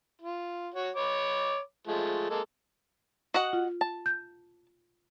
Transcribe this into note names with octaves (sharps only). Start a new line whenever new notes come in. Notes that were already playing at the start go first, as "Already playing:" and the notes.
F4
F#4 C#5
C#5 B5 D6
F3 G#3 A3
G#3 A#3 A4
F#4 D#5 F#5
F4
A5
G6